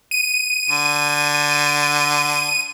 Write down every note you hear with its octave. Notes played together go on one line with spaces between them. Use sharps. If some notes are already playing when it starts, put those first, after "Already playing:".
D#7
D3